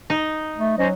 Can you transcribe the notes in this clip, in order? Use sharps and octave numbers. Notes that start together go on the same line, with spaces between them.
D#4
A3
F#3 C#4 C5 D#5